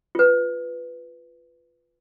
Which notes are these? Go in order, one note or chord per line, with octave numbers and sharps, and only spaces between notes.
F4 B4